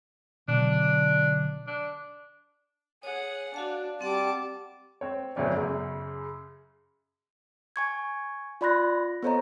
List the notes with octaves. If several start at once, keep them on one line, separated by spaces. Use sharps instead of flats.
B2 D3 F#3 D4
D4
G#4 C#5 F#5
D4 F#4 F5 A5
G3 C4 F#5 A5 D6
C4 C#5
G1 D2 A2 F#3 C#4 D5
F#2 C#3
G#5 C#6 G#6
F4 D5 B5 C6 F#6 A#6
B3 A4 C5 C#5 D#5 A#5